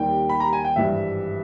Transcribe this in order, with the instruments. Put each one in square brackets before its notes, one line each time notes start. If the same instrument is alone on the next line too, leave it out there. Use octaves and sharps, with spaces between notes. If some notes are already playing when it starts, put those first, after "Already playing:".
Already playing: [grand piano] D#2 D#3 G3 G5
B5
A#5
G#5
G5
G#1 G2 E3 G3 E5